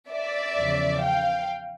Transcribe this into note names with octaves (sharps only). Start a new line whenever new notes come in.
D5 E5
E2 C#3 F3
F5 G5